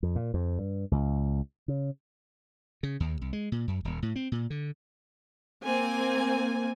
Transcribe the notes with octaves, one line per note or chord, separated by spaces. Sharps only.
F2
A#2
F2
G2
C#2
C#3
C#3
D#2
C2
G#3
A#2
F#2
D#1
A2
C4
A#2
D3
A#3 C4 G#5